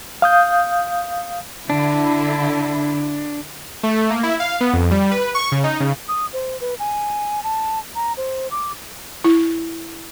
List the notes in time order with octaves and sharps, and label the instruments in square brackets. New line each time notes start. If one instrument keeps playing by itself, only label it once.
[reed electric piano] F5 D#6 G6
[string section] D3 E4 [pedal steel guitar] D4
[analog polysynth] A3
A#3
E4
F5
B3
F2
G3
B4
C#6
C#3
D#4
C#3
[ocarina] D#6
C5
B4
G#5
A5
A#5
C5
D6
[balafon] E4